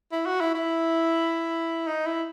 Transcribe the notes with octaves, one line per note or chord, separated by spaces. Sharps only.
E4
F#4
E4
E4
D#4
E4